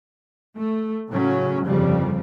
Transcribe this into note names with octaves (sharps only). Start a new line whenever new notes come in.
A3
A2 C#3 F#3 C#4
G1 F2 C#3 F3 G3